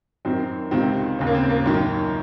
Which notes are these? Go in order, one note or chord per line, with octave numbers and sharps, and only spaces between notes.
F#2 D#3 C4
C#2 C3 D#3 C4
D#2 C#3
A#3
C4
A#3
F#2 D#3